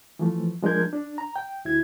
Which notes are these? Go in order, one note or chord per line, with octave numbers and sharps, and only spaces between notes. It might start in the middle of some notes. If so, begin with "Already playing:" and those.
E3 F3 A3
F3 G#3 D4 A#4 G6 G#6
D4
A#5
G5
D2 E4 G#6